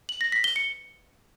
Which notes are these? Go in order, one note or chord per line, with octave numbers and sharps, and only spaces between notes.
F#7
A#6
B6
G7
C#7